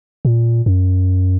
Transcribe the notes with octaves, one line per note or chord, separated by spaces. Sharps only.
A#2
F#2